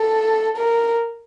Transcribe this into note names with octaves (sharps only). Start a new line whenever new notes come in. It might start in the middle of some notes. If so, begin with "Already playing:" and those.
Already playing: A4
A#4